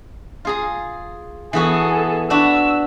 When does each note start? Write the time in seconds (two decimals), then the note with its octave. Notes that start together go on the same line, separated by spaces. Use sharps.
0.45 F4 G#4 A#5
1.53 E3 B3 F#4 G#4 A4
2.30 D4 F#4 B4 E6